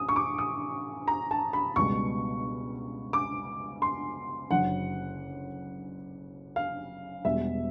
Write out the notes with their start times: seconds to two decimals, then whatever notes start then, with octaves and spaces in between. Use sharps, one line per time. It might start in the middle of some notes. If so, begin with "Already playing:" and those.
Already playing: A1 D#6
0.09 C#6
0.16 D6
0.38 D#6
1.08 A#5
1.31 A5
1.53 B5
1.76 C#2 B2 G3 B3 C#6
3.13 D6
3.82 C6
4.50 F#1 F#2 D3 F#3 F#5
6.56 F5
7.25 E1 E2 B2 G3 E5